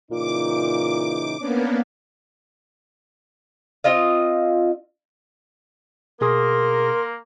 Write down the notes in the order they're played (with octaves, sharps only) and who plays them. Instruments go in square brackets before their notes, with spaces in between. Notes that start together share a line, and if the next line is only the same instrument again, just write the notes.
[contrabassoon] A#2 [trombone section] C#3 E3 D#4 [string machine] D6
[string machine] A#3 B3 [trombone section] C#4 D4
[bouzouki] C4 F4 D#5 F5
[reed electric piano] B2 G#4 D#6 [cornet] A#3 [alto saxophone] A#4 [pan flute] C6